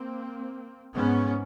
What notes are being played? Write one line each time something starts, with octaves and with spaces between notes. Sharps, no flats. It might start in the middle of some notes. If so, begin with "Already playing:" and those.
Already playing: A#3 C4
G#2 B3 C#4